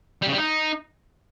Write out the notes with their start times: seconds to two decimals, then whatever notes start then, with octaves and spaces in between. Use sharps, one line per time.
0.22 G3
0.27 C#3
0.33 G3
0.38 D#4